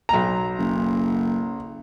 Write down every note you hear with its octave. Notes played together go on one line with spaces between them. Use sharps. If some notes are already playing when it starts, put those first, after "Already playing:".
B1 A#5
F#1